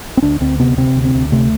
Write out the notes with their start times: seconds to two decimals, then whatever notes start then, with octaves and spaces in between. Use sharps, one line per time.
0.17 C4
0.22 D2 D4
0.41 D2 C4
0.59 C3 B3
0.78 C3 C4
0.96 D2
1.05 C4
1.15 D2
1.32 C3 A3